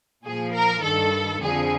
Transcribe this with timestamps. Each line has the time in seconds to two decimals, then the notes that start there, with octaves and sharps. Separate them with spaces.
0.25 A#2 F3 G#4
0.54 A#4
0.84 G2 D#3 A4
1.43 F2 D3 F3 G#4